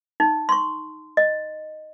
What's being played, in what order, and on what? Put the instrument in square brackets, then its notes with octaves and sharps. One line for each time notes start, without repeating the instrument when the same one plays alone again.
[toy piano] D#4
C6 C#6
D#5